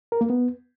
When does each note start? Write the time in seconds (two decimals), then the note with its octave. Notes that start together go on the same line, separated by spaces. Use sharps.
0.12 A#4
0.21 A#3
0.30 B3